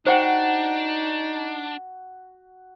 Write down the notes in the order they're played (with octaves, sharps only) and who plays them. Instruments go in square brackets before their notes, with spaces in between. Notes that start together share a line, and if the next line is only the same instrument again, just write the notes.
[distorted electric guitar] D4 [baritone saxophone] D#4 [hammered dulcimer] F#4 [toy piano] C5 F#5 G5